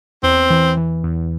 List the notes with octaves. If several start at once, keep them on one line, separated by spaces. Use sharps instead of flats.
E2 C4
E3
E3
E2